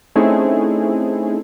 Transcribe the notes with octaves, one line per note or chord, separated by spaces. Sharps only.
A3 C4 C#4 D#4 E4 G#4